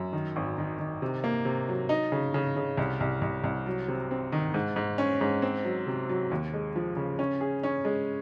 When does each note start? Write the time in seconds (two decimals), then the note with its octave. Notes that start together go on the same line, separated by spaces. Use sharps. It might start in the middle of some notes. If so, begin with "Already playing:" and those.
Already playing: F#2
0.13 D#3
0.36 G#1
0.58 D#3
0.79 D#3
1.02 C3
1.24 A#3
1.45 C3
1.68 F#3
1.89 D#4
2.12 C#3
2.34 C#3
2.56 C#3
2.77 C2
3.00 C2
3.22 C2
3.44 C2
3.66 F#3
3.88 C3
4.11 C4
4.32 D#3
4.54 G#2
4.76 G#2
4.98 C#4
5.21 G#2
5.42 C4
5.64 F#3
5.87 C3
6.09 F#3
6.31 D#2
6.54 G#3
6.76 F3
6.97 C#3
7.19 C#4
7.41 G#4
7.63 C#4
7.85 G#3